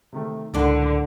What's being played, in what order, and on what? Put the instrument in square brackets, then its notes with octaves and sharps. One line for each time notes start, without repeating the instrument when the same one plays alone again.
[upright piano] C3 D#3 A3
[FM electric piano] C#2 [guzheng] A2 D4 C6 [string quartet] D3 [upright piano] A4 A#4 F#5